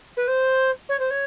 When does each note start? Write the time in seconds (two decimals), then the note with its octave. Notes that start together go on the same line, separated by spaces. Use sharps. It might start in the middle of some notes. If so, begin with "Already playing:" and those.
0.17 B4
0.27 C5
0.89 C#5
0.99 C5
1.10 C#5